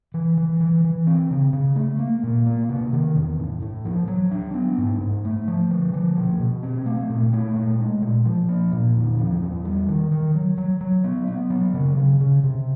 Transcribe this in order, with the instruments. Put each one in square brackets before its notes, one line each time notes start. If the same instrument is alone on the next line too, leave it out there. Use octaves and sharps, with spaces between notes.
[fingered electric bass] E3
E3
E3
E3
C4
C#3
C#3
A3
A#3
A#2
A#3
C3
D#3
E2
A2
A2
F3
F#3
D4
B3
G#2
G#2
A3
F3
D3
F3
B2
B2
C4
A3
A#2
A3
A#2
G#3
A#2
F3
A#3
A#2
E2
F3
E2
G3
D#3
D#3
F#3
F#3
F#3
B3
B3
F#3
C#3
C#3
C#3
C3